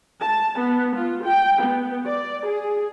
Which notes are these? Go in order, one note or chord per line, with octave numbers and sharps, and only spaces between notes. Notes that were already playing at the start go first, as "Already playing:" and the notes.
A5
B3
F4
G5
B3
D5
G#4